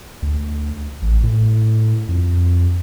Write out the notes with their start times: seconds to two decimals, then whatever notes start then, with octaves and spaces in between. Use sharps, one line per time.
0.22 D2
1.02 A1
1.23 A2
2.09 F2